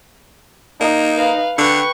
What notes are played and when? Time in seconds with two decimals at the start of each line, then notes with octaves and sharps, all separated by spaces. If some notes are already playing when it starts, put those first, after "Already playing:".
0.81 A#3 D#4
1.16 B4 F5
1.58 D3 B4 G5 C#6